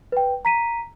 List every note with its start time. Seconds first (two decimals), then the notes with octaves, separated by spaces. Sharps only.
0.12 B4 G5
0.45 A#5 B6 D#7